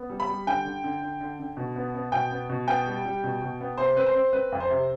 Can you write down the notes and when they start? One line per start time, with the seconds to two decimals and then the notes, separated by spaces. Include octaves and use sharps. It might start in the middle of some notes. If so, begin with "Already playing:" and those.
Already playing: B3
0.09 G3
0.20 B5
0.28 G3
0.47 D3 G5
0.65 D3
0.84 D3
1.02 D3
1.21 D3
1.39 D3
1.57 B2
1.76 B3
1.95 B3
2.12 B2 G5
2.31 B3
2.49 B2
2.68 B3 G5
2.86 G3
3.05 G3
3.24 B2
3.42 B2
3.60 B3
3.78 C3 C5
3.96 C4 B4
4.06 C5
4.15 C4
4.33 C4 B4
4.52 F2
4.60 C5
4.70 C3